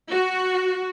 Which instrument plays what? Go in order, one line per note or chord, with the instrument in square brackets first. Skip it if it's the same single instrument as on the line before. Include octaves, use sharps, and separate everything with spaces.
[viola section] F#4